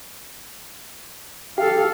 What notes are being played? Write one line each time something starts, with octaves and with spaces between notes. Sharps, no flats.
G4 A4 F5